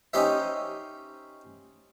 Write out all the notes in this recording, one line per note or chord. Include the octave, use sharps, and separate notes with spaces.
C#4 D#4 G4 C5 E5